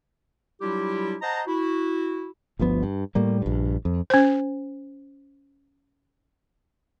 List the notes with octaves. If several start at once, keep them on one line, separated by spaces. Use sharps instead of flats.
F#3 G3 D4 E4 F4 G4
C5 D#5 F#5 A5 A#5
E4 F#4
G1 D2 F3 B3
G2
A2 G3 A#3
A#1 G2
F2
C#4 C5